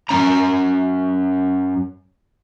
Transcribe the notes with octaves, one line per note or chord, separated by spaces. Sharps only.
F#2 A#2 C#4 A#5